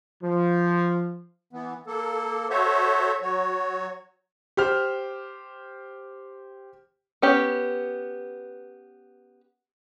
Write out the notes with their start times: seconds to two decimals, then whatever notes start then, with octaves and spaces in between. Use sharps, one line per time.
0.23 F3
1.53 E3 B3
1.87 A#3 A4
2.50 F#4 A4 C5 C#5 E5
3.21 F#3 F#4 C#5
4.57 G4 C5 F6
7.22 B3 C#4 G4 B4